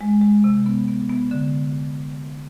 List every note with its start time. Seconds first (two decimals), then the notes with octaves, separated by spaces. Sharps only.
0.01 G#3
0.22 G#3
0.44 C3
0.66 B3
0.88 B3
1.09 B3
1.31 D3